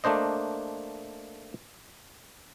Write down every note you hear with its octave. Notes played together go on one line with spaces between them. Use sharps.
A3 A#3 D4 C5 D#5